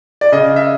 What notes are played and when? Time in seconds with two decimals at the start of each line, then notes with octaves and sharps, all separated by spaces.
0.21 D5
0.32 C#3 D#5
0.56 E5